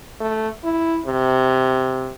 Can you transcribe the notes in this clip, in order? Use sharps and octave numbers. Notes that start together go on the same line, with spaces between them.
A3
E4
C3